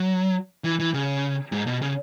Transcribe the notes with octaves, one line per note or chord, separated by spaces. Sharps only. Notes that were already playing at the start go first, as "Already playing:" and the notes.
Already playing: F#3
E3
E3
C#3
G#2
B2
C#3